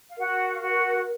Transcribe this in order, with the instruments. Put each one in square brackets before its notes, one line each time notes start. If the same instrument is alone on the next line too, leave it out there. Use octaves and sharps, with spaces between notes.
[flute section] F5
[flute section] F#4 F#5 [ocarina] A#4
[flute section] F5
F#4 F#5